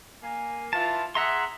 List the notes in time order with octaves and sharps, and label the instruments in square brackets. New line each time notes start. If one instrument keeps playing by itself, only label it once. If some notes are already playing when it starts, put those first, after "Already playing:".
[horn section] A#3 G#5
[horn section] E3 F4 [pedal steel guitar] A5
[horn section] G#4 E5 [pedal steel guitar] F#5 A#5 C6